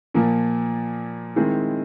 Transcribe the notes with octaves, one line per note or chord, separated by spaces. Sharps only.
A#2 F3 A#3
D#3 G#3 C4 E4 G#4